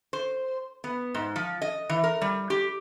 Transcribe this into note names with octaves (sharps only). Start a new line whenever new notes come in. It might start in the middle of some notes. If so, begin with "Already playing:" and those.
C5
B3
G#2
F3
D#5
E3
A#4
G3
G4